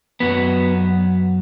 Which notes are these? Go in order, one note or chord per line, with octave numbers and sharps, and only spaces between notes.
F#2 F#3 B3